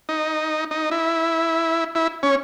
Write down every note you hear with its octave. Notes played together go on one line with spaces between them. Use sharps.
D#4
D#4
E4
E4
C#4